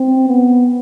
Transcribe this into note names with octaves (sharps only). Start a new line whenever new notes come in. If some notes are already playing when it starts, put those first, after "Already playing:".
Already playing: C4
B3